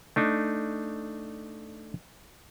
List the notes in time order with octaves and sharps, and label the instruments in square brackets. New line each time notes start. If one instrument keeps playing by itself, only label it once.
[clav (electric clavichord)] A3 D4 D#4